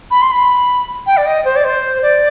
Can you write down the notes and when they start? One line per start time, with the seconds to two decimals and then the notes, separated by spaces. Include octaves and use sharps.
0.11 B5
0.22 C6
0.32 B5
1.07 G5
1.17 D5
1.26 D#5
1.45 C5
1.56 D5
1.64 C5
2.02 D5